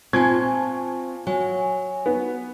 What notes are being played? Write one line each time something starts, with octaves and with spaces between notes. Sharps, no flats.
A#2 C4 G#5 A5 C#6 G#6
F#3 G#5
B3